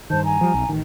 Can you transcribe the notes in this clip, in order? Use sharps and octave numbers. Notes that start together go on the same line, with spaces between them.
G2 D#3 C5 A5 G6
G#5 A#5
F3 G3
B1
A1 D#3